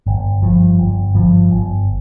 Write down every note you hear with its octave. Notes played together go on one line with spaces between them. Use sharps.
G1
G2 F3
G1
G2 F3
G1